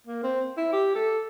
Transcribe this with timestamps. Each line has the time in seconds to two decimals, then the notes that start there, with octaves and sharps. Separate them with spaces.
0.07 A#3
0.23 C4
0.57 E4
0.73 G4
0.95 A4